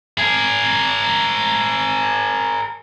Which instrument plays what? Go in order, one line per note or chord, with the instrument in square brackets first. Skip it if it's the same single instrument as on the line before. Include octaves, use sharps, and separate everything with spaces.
[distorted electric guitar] G#4 A#4